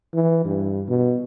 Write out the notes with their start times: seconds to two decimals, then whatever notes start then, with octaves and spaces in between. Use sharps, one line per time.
0.14 E3
0.45 G2
0.88 B2